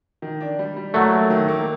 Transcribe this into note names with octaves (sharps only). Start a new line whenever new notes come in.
D#3
D4
G3
G3
F#3 A3 A#3
A#3
D#3
A#3